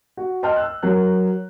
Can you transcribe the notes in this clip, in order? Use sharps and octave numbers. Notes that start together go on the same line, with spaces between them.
F#4
D#5 G5 A5 C6 F6
E6 F#6
F#3 A#4 F#6